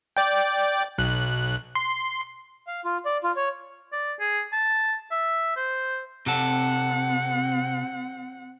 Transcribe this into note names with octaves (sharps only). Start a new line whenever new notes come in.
D5 G5
B1 F#6
C6
F5
F4
D5
F4
C#5
D5
G#4
A5
E5
C5
C3 C4 A4 F#5